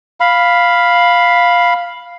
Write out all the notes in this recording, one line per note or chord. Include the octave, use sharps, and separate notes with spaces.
F5 B5